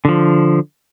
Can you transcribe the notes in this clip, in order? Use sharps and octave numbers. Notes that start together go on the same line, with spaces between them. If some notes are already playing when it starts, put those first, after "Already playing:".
D3 F3